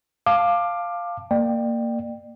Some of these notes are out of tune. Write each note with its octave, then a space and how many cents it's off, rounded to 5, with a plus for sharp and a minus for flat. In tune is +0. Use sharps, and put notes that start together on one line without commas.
F5 +0 A5 +0 D6 +20
A#3 -15 D5 +30 G5 +0